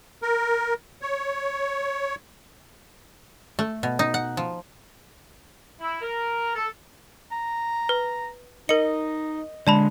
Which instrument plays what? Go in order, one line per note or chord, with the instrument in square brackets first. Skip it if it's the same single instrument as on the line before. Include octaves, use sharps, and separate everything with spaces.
[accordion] A#4
C#5
[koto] A3
B2
D#4
F#5
F3
[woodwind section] E4
A#4
A4
[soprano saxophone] A#5
[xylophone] B4
[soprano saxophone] D#4 [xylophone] A#4 C#7 [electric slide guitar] D#5
[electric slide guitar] D3 G#3 [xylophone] D5 A5 B5